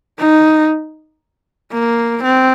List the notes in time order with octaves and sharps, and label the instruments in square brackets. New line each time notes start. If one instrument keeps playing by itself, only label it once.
[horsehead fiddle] D#4
A#3
C4